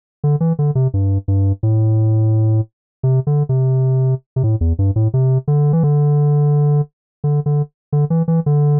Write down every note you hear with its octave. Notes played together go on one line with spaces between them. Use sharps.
D3
E3
D3
C3
G2
G2
A2
C3
D3
C3
C3
A2
E2
G2
A2
C3
D3
E3
D3
D3
D3
D3
E3
E3
D3